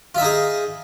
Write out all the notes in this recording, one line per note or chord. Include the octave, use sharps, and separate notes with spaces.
D#4 F4 G#4 E5